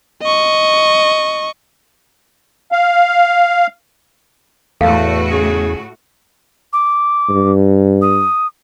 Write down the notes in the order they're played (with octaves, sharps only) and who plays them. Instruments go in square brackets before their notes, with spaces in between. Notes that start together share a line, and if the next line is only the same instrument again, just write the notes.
[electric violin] D#5 C#6
[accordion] F5
[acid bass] E2 [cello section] A2 F#4 [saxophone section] A3 [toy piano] A4 F5
[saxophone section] C#3 G#4
[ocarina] D6
[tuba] G2
[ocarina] D#6